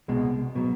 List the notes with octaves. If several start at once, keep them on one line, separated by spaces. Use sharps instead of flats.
C2 B2 G#3
B2 F#3